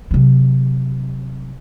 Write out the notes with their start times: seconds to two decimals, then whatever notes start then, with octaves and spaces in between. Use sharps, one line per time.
0.11 C3 F#3